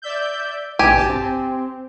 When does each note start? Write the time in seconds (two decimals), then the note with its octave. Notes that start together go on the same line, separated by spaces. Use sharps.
0.02 D5 E5 G6
0.79 A#1 B2 G4 G#5
0.95 G1 A5
1.08 C4